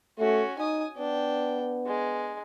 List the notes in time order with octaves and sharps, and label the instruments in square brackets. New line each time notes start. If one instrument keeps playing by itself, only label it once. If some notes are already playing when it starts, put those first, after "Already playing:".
[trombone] A3 [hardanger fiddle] C#4 F#4
[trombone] D#4 [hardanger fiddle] G#5 D#6
[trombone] B3 [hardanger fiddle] D4 G5
[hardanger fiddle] G#3